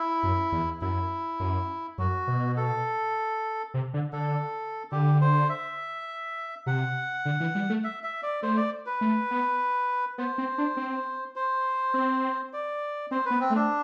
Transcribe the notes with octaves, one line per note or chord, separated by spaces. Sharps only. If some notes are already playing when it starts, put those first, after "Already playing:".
Already playing: E4
F#2
E2
F#2 E4
F#2
F#2 F#4
B2
A4
C3
D3
D3 A4
D3 G4
C5
E5
C3 F#5
D3
E3
G3
A3
E5
E5
D5
A3 C5
D5
B4
A3
B3
B3 C5
C4
D4
C4
C5
C4
D5
C4 C5
B4
B3
C4
A3
D4